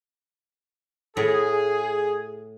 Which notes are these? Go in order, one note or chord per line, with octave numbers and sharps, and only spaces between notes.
A2 G#4